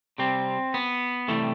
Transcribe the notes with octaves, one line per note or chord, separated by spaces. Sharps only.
C3 G3 C4
B3
C3 E3 G3 A3